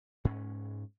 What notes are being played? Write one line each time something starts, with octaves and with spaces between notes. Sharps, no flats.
G#2 C#4